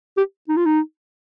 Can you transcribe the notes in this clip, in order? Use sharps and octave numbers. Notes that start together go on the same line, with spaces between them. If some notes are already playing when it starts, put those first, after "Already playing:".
G4
D#4
F4
D#4